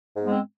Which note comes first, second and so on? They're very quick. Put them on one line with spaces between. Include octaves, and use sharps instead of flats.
G#2 B3 G#3 C4